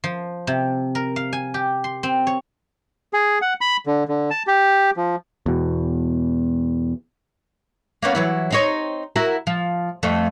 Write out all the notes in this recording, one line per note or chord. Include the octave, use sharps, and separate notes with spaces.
F3
C3
A#4
F5
G#5
G4
C6
C4
C#5
G#4
F#5
B5
D3
D3
A5
G4
F3
E2 B2
A#3 B3 C#4
E3 F#3 E4
C4 D#4 C#5
E4 F#4 A#4
F3
F2 A3